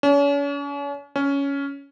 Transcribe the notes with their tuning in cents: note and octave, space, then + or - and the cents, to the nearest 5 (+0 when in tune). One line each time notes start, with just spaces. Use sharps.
C#4 +40
C#4 +10